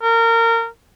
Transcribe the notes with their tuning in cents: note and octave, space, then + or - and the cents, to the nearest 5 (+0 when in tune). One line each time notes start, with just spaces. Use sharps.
A#4 -25